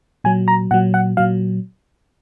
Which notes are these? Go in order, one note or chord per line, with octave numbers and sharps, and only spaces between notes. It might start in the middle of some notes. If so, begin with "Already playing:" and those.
A#2 F#3 G#5
A#5
A#2 F#3 F#5
F#5
A#2 F#3 F5